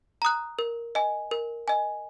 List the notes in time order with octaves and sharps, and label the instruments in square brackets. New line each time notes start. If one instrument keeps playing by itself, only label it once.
[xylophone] A#5 D#6 F#6
A#4
D#5 G#5
A#4
D#5 G#5